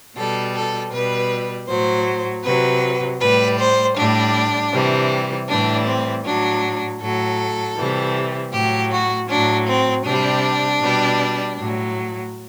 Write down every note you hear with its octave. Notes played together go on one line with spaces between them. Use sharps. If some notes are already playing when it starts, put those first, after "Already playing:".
B2 G3 A4
A4
B2 G3 B4
A2 F#3 C5
C3 F#3 B4
A2 G3 B4
C5
A2 G3 D4
C3 E3 G3
A2 E3 G3 D4
C4
A2 F#3 D4
A2 F#3 A4
C3 E3 G3
A2 F#3 G4
F#4
A2 F#3 D4
C4
C3 G3 D4
B2 G3
A2 F#3